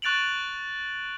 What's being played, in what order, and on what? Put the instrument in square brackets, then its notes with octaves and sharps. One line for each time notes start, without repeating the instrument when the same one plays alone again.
[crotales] C#6 F#6 A6 D7 F7 F#7